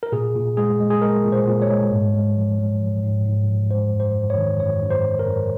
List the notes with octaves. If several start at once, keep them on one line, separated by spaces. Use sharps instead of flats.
A#4
A#2 G#4
A#2
G#3 G#4
G#3
G#4
G#3 A#4
A#2
C5
A#2
C#5
G#3
G#2
G#3
F3
G#3
F3
G#2
G#2
F3
G#3 C5
F#2
C5
F#2
C#5
D#3
F#2 C#5
F#2
C5
F#2
A#4
F#2